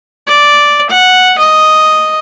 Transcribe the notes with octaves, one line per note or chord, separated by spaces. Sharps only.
D5
F#5
D#5